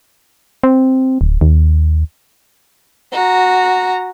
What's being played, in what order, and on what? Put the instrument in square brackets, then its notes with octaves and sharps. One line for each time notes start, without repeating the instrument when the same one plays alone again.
[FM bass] C4
D1
D#2
[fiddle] F#4 A#5